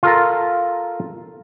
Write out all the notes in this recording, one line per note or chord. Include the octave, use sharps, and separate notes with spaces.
F4 A4 A#4